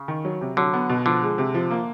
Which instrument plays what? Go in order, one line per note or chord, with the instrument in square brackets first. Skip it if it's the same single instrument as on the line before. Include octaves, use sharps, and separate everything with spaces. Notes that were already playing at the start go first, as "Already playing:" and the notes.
Already playing: [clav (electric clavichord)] C#3
[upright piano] D#3
F#3
C3
[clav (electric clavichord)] D3 [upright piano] F#3
[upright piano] B3
B2
[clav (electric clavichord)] D3 [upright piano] F3
[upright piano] G#3
C3
F3
A#3